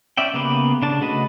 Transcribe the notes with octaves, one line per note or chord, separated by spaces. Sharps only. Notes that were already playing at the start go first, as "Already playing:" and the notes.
C#4 D5 E5 G5
C#3 A#3 B3 G4 B4
C#3 D4 A5
C#3 A3 F#4 B4 D#5